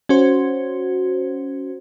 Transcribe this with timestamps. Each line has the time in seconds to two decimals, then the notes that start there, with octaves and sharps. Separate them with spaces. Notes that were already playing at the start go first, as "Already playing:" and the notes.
0.09 C#4 F#4 C5